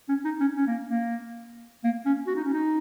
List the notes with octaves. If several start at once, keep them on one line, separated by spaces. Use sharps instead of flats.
C#4
D#4
C#4
C#4
A#3
A#3
A#3
C#4
F#4
D#4
C#4
D#4